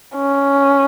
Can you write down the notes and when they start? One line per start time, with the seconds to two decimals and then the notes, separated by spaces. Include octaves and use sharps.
0.15 C#4